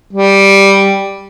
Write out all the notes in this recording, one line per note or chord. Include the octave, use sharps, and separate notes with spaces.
G3